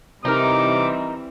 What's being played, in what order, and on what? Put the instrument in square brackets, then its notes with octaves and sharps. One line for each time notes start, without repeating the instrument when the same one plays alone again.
[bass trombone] C3 [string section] E3 G3 C4 [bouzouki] D#4 A#4 [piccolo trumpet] D6